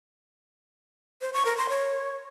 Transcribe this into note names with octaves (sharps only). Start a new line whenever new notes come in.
C5
C#6
A#4
C6
C#5